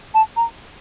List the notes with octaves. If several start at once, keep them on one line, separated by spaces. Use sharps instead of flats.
A5
A#5